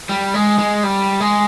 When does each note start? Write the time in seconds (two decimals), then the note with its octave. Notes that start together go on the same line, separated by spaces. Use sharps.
0.09 G3
0.34 G#3
0.58 G#3
0.83 G3
1.20 G#3